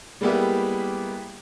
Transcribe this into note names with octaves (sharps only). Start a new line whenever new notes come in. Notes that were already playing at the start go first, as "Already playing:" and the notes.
G3 G#3 A#3 B3 E4 G4